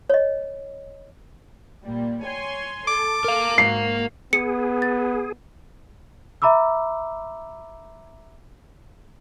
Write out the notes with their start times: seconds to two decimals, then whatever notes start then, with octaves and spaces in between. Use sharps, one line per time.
0.10 C#5 D#5
1.84 A#2 G3 A#3
2.25 C#5 G#5 C6
2.88 A4 D6
3.25 A#4 F5
3.58 G#2 A#3 F#4 C7
4.33 B3 G#4 C#7 D#7
4.82 A6
6.42 E5 A#5 B5 D6 E6